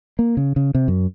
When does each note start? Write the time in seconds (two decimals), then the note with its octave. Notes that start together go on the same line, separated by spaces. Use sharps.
0.19 A#3
0.37 C#3
0.56 C#3
0.75 C3
0.88 F#2